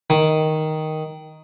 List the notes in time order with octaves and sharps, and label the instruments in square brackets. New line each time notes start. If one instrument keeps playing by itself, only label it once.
[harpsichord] D#3